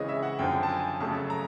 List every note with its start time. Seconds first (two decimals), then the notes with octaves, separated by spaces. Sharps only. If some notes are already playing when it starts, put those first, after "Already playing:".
Already playing: C#3 E3 G#3 C4 C#5 D#5
0.08 E5
0.23 F#5
0.39 F#2 D3 F3 G5
0.63 A5
0.69 G#5
1.00 F2 C#3 F#3 A3 A5
1.30 A#5